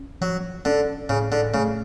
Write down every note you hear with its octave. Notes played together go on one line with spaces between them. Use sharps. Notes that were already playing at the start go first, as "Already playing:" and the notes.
Already playing: C#4
F3 F#3
D3 C#4
A2 C#3
D3
C#3 A3